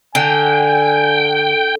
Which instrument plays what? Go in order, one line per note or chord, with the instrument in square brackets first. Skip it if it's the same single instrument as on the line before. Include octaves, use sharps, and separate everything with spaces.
[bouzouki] D3 [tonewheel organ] G5 [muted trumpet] G#5